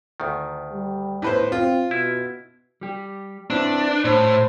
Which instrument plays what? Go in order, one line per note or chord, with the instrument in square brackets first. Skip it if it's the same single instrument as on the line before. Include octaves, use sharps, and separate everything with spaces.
[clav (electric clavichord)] D2 D#3
[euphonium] G3
[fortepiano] A2 B4 C5
[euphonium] C4 [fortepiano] F4
[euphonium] B2 [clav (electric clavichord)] E4
[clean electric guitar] G3 G4
[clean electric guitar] C4 E4 B4 [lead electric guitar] D4
[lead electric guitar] A2 [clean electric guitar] C5